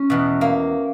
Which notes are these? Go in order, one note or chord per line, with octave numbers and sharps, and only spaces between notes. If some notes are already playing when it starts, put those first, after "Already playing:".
Already playing: C#4
E2 B2
A#3